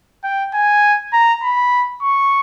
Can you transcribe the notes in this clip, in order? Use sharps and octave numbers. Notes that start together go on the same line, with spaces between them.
G5
G#5
A#5
B5
C#6